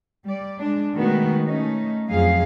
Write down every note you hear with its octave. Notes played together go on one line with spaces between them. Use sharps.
G3 D5
G#3 D4
B2 D#3 G#3 A3 B3 F#4
A3 C#4 D#4
F2 F#3 G#4 F5